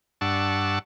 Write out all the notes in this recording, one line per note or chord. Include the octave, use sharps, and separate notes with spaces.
G2 D4 F#5 A5 C#6 E6